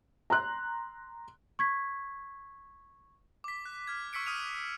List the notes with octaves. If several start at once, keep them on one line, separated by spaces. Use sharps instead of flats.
A#5 C6 F#6
C#6 G#6 B6
D6 B6
F#6
F6 G#6
C#6 E6 B6 C#7 D7
D#6 F6 D#7 F7